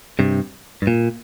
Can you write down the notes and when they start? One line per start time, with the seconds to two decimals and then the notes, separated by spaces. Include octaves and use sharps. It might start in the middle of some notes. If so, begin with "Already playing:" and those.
0.19 G2 C3
0.82 G2
0.87 A#2